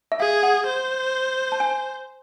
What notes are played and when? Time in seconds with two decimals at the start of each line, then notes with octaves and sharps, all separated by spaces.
0.12 E5
0.20 G#4 F5
0.43 F#5
0.67 C5
1.52 A5
1.60 G#5